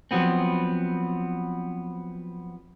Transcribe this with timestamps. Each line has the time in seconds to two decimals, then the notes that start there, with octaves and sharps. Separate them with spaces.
0.11 F3 F#3 B3 C4